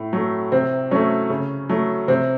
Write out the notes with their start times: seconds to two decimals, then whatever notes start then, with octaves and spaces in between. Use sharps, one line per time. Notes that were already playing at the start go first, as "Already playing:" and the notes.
Already playing: A2
0.13 F#3 A3
0.52 C3 C4
0.91 F#3 A3 C#4
1.30 C#3
1.69 F#3 A3
2.08 C3 C4